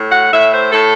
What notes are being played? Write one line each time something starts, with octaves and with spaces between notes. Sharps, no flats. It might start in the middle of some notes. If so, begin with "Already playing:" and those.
Already playing: A2
F#5
A2 E5
C5
A2 A4